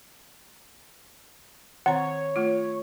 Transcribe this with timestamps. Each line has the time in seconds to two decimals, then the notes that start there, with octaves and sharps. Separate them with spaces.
1.86 D#3 C4 C#5 F#5 A#5
2.36 A3 F4